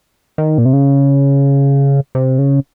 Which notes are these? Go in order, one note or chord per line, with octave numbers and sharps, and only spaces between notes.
D#3
A#2
C3
C#3
C3
C#3